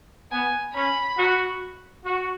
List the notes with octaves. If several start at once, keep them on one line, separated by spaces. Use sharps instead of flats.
B3 G#5
C#4 B5
F#4
F#4